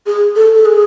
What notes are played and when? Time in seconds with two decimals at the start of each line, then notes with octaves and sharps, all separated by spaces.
0.06 G#4
0.36 A4
0.55 A4
0.65 G#4